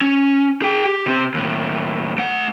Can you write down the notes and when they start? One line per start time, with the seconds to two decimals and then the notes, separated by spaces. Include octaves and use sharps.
0.01 C#4
0.62 G#4 G5
0.86 G4
1.06 C3 C4
1.34 D#2 A2
2.18 A3 F#5